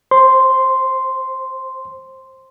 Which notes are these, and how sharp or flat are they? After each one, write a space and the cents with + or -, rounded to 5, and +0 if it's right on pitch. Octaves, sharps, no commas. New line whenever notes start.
C5 +20 C6 -5